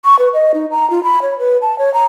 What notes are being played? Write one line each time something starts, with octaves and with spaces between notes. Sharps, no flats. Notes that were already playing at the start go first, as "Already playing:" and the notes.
C#6
B4
D#5
D#4
A#5
F4
B5
C#5
B4
A5
C#5
A#5